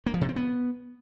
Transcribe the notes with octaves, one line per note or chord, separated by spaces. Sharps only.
A#3
F3
C3
C4
B3